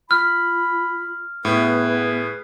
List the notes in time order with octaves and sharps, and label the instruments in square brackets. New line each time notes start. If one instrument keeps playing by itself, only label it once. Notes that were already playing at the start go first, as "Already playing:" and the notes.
[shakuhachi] F4 [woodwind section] B5 [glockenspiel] F6
[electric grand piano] A2 [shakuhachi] B3 [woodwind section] G#4 B4